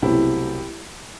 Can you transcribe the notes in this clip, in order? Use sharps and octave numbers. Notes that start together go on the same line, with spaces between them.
C2 B2 F#3 A3 C4 E4 G4